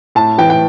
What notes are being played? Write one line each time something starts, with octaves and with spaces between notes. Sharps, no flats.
A2 A5
E3 G5
G5